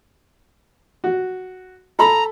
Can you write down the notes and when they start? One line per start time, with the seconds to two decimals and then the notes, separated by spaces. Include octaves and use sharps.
1.04 F#4
1.99 A4 A#5 B5